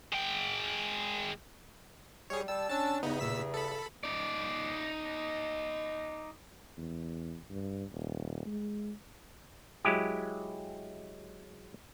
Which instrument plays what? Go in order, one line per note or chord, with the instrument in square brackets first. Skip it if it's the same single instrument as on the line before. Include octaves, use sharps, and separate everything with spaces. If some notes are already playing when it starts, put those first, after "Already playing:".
[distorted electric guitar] G#3 G5
[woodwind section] G3 [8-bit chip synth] G#4 C#5
[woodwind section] G3 A5 [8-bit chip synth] E6
[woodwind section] C#4 D4 [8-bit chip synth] A5 E6 A6
[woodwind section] E2 G2 C#3 [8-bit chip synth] B3 D#4
[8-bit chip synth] A#2 E6 B6
A4 B5
[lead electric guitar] D#4 D5
[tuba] E2
G2
D#1
G#3
[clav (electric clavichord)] F#3 G#3 E4 G4